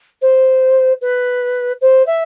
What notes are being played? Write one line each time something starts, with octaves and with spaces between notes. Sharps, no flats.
C5
B4
C5
E5